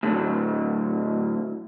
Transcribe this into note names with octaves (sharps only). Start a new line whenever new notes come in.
A2 D3 E3 F#3